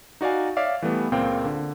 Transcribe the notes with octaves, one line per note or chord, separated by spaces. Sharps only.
D#4 F#4 D5 F5 G#5
C#5 D5 E5 F5 D6
E3 G3 A3 B3
C#2 A#2 A#3 C4 F5 G5
D3